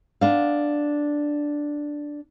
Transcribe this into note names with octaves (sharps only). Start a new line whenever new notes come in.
B3 D4 F5